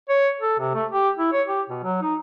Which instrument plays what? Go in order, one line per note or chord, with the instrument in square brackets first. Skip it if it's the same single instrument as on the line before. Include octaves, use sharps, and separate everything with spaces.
[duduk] C#5
A4
C3
A3
G4
E4
C#5
G4
B2
F#3
D#4